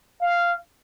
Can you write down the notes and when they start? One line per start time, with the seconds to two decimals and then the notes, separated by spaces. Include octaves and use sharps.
0.22 F5